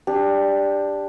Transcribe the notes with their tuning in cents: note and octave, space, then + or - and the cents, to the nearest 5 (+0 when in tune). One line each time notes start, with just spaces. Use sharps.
D4 +0 G4 +15